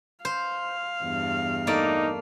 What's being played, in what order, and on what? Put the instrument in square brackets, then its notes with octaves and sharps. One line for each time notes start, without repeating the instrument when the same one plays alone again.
[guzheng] C5 [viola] F5
[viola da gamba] E2 G2
[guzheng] A3 A#3 D5 [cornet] D#4